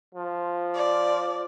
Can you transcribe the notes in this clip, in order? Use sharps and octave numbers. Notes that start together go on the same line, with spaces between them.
F3
D5